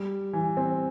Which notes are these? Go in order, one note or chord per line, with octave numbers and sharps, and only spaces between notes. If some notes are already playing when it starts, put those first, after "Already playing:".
Already playing: G3
E3
C4